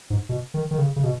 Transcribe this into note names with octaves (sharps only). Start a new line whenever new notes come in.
G#2
B2
D#3
D#3
C#3
C#3
B2